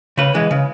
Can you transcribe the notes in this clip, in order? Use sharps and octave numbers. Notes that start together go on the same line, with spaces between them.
C#3 B4
E3 G#3
C#3